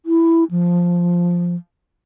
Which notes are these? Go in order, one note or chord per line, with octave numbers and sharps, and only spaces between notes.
E4
F3